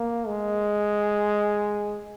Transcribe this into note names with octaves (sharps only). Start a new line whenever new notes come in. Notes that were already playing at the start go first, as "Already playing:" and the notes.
Already playing: A#3
G#3